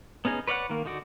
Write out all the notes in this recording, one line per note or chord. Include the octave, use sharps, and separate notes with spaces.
B3 C#4 D#4 G#4
B4 C#5 D5 E5 F#5
D#3 A#3
D3 D#4 F#4 D5